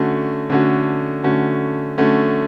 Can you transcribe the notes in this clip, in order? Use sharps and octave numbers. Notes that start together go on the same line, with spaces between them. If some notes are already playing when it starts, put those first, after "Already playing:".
Already playing: D3 A3 C#4 F#4
D3 A3 C#4 F#4
D3 A3 C#4 F#4
D3 A3 C#4 F#4